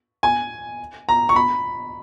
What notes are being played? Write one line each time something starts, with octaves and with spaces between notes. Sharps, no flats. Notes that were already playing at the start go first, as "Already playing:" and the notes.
G#5
A#5
C#6
B5